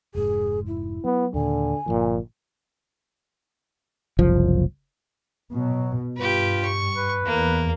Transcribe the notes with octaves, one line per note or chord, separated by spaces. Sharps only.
F1 G#2 G#4
E4
F#3 B3
D#2 A#2 D3 G#5
G1 C2 A#2 F3
F#1 C2 F3
B2 F#3
G2 F4 G4 B4
C#6
B4
E2 A#3